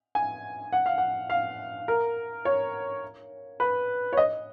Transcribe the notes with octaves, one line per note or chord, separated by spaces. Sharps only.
G#5
F#5
F5
F#5
F5
A#4
C#5
B4
C#5
D#5